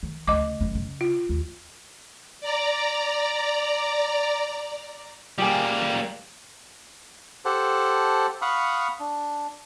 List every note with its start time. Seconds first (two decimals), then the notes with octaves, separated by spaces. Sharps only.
0.03 D#3
0.28 D2 C#3 D#5 D6
0.61 F#1 F#2
0.75 C#3
1.01 F4
1.29 D#2
2.41 D5 A#5
5.38 G3 A#3 G4 G#4 G#5
7.45 G4 A4 C5 F#5 A5
8.42 F5 F#5 B5 C#6 D#6
9.00 D4